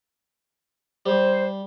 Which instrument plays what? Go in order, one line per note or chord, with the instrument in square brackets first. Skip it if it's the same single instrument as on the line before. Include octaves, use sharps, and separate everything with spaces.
[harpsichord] G3 [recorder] C5